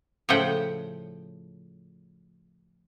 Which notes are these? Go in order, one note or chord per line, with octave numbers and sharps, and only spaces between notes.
A2 C#3 F3 F#5 G5